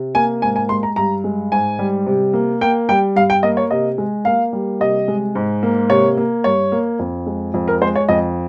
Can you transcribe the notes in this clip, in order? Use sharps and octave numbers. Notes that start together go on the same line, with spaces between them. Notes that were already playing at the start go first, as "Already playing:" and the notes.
Already playing: C3
A#3 G#5
G#2 G#5
G#5
G#3 C6
A#5
G2 A#5
G#3
G#2 G#5
G3
C3
A#3
A#3 G5
G3 G5
G2 F5
G5
A#3 D#5
C#5
C3 D#5
G#3
A#3 F5
G3
C3 D#5
G#3
G#2
A#3
C3 C#5
A#3
G2 C#5
A#3
F2
G#3
F2
A#4
G#3 C5
C#5
F2 D#5